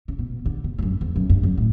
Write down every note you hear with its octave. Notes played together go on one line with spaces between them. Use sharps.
C#3
B2
D3
B2
G2
F#2
E2
F#2
G2
F#2
A2